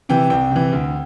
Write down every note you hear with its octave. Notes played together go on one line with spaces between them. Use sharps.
C3 E3 G5
C2 G5
C3 E3
D2